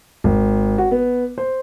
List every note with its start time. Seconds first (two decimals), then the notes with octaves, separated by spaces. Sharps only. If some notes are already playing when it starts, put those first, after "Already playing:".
0.24 G#1
0.78 F#4
0.91 B3
1.38 C5